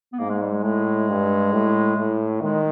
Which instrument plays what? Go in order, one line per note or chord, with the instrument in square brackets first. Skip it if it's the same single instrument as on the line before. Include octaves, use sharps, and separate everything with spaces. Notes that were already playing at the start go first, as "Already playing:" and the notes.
[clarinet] B3
[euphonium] G#2 [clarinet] A#3
[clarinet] G#3
G3
G#3
[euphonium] A2 [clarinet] G#3
[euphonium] G2
A2
A2
[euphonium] D#3 [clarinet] G#3